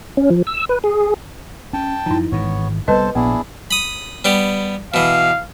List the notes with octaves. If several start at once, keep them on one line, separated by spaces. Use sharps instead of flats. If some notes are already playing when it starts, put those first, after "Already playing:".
C#4
F3
E6
B4
G#4
C#4 G5 A5
F#2 F3 D#4 E4
G#1 G#2 E3 B3 C#5
C2 G3 B3 A4 B4 C5 D#5 A5
A#1 B3 D4 E4 G#4
B5 D#6
G3 B3 G4
B2 E3 F5